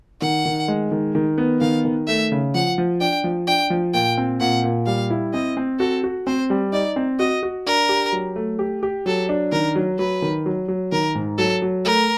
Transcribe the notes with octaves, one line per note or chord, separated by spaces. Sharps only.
D#3 F#5
D#3
G#3
D#3
D#3
B3
D#3 F5
D#3
A3 E5
C#3
F3 F#5
F3
D4 G5
F3
D4 G5
F3
A#2 G5
C4
A#2 F#5
A#2
G3 F5
E4
C4 D#5
C4
F#4 A4
F#4
C4 C5
G3
D#4 D5
C4
F#4 D#5
F#4
D4 A#4
G4
F#3
A3
G4
G4
F#3 A4
D4
D#3 A#4
F#3
F#3 B4
D#3
F#3
F#3
D#3 A#4
G#2
F#3 A4
F#3
A3 A#4